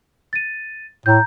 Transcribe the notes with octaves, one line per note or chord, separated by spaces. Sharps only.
A6 D#7
A2 A#5 G6